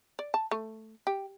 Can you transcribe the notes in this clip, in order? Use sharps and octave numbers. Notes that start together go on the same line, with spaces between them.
D5
A5
A3
G4